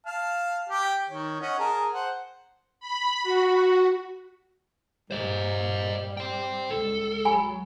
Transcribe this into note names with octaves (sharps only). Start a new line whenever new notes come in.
F5 A5 F6
G4 G5 D6
D#3 C#5
C#4 D#5 F#5
G#4 A#4 A5
C5 F#5
B5
F#4
G2 A#2 G3 C5 D#5
C5 G5
C#2 A4
F#3 G#5 B5